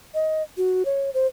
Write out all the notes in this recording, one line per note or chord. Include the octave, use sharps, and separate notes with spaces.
D#5
F#4
C#5
C5